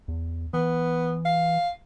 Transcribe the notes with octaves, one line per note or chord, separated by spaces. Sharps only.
E2
E3 B3
F5